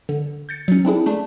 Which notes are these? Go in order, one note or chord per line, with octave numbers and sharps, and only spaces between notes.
D3
G6 A6 C#7
F#3 C#4
C4 D4 E4 G#4
A3 D4